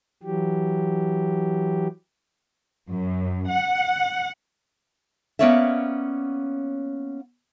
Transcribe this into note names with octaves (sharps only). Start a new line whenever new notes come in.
E3 F#3 G4
F#2
F#5
A#3 B3 C#4 C#5 D5 E5